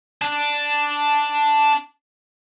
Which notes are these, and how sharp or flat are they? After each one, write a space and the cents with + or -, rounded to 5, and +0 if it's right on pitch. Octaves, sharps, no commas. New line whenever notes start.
D4 +0 A5 +0